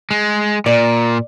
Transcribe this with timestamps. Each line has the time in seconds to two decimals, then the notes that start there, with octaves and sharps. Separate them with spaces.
0.11 G#3
0.66 A#2 D5